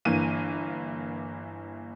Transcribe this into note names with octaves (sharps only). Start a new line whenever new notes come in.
G1 E3 A#3 D#7